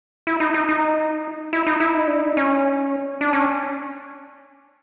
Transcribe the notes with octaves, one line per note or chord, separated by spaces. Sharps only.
E4
D#4
D#4
D#4
E4
D#4
E4
D#4
D4
D#4
C#4
D4
C#4